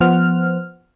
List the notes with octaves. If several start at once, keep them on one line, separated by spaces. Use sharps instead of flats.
F3 B3 C5 F#5 F6